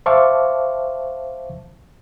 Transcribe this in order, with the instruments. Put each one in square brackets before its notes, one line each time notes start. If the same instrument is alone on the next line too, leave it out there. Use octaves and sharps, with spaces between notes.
[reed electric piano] C5 E5 F5 A5 C#6 D6